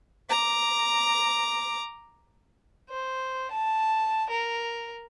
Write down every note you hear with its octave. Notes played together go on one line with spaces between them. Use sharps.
A#5 D6
C5
A5
A#4